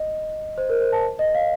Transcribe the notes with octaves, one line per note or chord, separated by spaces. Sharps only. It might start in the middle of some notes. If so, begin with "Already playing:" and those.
Already playing: D#5
C5
A#4
C5
A5
D#5
F5